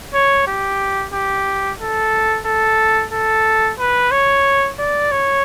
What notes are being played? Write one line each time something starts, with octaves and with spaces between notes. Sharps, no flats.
C#5
G4
G4
A4
A4
A4
B4
C#5
D5
C#5